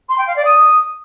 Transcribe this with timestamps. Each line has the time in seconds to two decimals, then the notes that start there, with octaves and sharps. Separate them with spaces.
0.09 C6
0.18 G5
0.27 F5
0.36 D5
0.45 D#6